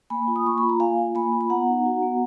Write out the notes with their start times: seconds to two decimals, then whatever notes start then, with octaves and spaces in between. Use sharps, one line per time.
0.10 A#3 G#5 B5
0.27 F4
0.36 D#6
0.45 A#3 C#6
0.58 B5
0.63 F4
0.69 A#5
0.80 A#3 F5 G#5
0.98 F4
1.15 A#3 G#5 B5
1.33 F4
1.41 B5
1.50 B3 F#5 A#5
1.68 D#4
1.85 F#4
2.03 B3